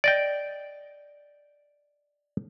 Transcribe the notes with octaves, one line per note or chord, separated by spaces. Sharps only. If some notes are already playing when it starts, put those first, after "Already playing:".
D5 D#5 G5